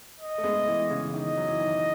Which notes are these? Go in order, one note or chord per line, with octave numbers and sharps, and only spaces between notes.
D#5
A3
G#3 B3
E3 G#3
C#3 E3
D#3 D#5
F#3
E3
D#3